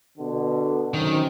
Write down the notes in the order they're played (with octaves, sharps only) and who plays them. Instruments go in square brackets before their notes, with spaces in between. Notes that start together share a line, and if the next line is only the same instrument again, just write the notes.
[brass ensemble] B2 D3
[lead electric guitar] D#3 [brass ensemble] F#3 C4 C#4